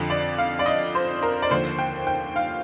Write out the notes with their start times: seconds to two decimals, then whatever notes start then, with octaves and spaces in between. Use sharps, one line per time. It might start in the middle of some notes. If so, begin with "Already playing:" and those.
Already playing: F2 D3 F3
0.10 D5
0.38 F5
0.59 D5
0.66 D#5
0.95 C5
1.23 A#4
1.42 D5
1.50 D#2 D3 F3 C5
1.79 G5
2.07 G5
2.36 F5